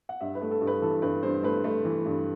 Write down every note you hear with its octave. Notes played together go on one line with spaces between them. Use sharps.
F#5
G2 E5
B4
A3
A4
G2
B4
E3 A4
G2 B4
G2 C5
A3 B4
A3
E3
G2